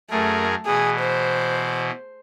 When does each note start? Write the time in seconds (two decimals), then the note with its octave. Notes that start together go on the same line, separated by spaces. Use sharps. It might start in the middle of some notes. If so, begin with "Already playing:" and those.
0.11 F#2 A3 G#4 A#4
0.66 B2 E3 G#4
1.00 C5